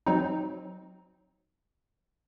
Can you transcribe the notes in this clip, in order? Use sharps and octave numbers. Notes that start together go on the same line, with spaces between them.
F#3 C4 D#4